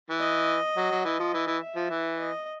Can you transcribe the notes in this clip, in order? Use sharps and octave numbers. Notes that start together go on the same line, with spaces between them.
E3
D#5
F#3
F#3
E3 D#5
F3
E3
E3
E5
F3
E3
D#5